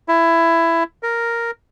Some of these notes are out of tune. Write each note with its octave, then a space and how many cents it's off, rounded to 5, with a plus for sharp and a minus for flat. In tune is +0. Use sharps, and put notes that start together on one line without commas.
E4 +15
A#4 +0